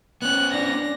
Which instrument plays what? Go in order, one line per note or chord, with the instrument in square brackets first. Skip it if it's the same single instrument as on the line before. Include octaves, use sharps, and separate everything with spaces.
[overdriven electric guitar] B3 C#4 [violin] F#6
[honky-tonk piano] D4 [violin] A#6